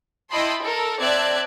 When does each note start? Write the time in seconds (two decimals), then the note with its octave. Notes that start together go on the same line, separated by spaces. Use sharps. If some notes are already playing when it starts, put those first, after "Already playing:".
0.31 E4 D#5 G5 A5 B5 C6
0.63 A4 A#4
1.00 C4 D5 E5 A5 F#6 G#6